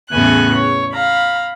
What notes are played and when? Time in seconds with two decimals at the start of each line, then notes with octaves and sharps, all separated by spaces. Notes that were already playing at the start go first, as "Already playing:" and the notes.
0.10 E2 A2 C#3 B3 G#5 F#6
0.54 C#5
0.93 F5 A#5 B5